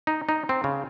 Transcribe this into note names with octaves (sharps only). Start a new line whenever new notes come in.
D#4
D#4
C4
C#3